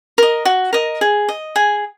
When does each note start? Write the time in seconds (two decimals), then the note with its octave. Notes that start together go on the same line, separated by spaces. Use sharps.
0.18 A#4 D#5
0.45 F#4
0.73 A#4 D#5
1.01 G#4
1.29 D#5
1.56 G#4 G#5